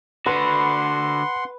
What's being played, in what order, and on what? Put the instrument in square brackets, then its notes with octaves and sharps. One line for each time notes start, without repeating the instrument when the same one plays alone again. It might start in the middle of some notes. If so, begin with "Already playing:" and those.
[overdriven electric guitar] D3 F#4 [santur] B4 [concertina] F#5 C6 [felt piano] B5